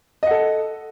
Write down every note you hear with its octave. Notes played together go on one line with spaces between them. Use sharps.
A4 D#5 F#5